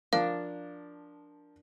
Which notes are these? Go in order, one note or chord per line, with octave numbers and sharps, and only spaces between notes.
F3 D4 A#4 F5